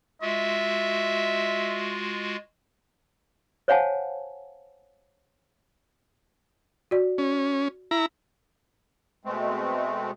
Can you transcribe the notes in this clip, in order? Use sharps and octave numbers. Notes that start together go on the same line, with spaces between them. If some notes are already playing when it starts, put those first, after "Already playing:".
G#3 F4 F#4 E5
C5 C#5 F5 F#5 G#5 A5
F#4 D5
C#4
E4 A#5
B2 G#3 A3 C4